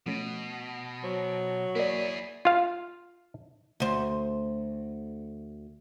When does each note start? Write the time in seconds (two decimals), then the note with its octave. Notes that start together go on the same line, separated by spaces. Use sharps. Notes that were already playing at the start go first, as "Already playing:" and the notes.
0.06 B2 F3 A3 C#4
1.04 F#3 C5
1.75 A#3 E4 G#4 A#4 D5
2.45 F4 F5
3.80 D2 C5